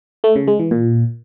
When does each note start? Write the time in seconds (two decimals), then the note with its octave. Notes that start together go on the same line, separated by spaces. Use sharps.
0.24 A3
0.36 C#3
0.48 G#3
0.59 E3
0.71 A#2